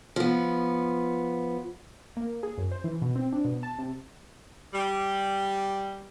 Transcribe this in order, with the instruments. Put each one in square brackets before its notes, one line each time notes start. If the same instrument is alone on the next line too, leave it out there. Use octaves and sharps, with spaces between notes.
[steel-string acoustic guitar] F3 B3
[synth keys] A#3
G#4
F#2
C5
E3
B2
C4
D4
B2
A5
C3
[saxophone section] G3